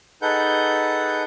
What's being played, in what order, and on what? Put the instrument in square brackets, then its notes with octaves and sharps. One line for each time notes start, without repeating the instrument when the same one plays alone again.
[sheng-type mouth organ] D#4 G#4 A4 B4 F#5 G6